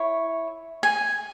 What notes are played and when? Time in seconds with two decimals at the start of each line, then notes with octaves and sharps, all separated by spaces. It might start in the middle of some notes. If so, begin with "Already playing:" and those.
Already playing: E4 C#5
0.83 G#5